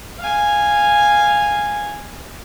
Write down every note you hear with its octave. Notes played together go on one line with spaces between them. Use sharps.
F5 G#5